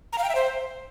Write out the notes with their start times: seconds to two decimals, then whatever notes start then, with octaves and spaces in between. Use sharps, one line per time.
0.13 A#5
0.18 F5
0.24 G5
0.29 E5
0.35 C5